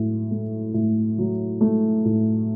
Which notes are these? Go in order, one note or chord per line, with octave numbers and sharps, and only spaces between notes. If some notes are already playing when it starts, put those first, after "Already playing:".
Already playing: A2 F#3
A3
A2
F#3
A3
A2